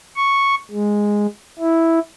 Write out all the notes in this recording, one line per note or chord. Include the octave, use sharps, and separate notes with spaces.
C#6
G#3
E4